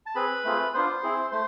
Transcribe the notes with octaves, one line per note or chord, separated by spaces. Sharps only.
A5
C4 G#4 B4 B5
A3 C4 F4 G#4
B3 D4 F4 C5 C6
C4 E4 G#4
A3 C5 C6